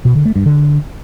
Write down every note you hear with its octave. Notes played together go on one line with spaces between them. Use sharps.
B2
D3
A3
G2
D3